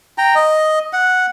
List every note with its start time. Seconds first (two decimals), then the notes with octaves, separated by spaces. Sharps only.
0.18 G5 A#5
0.35 D#5
0.93 F#5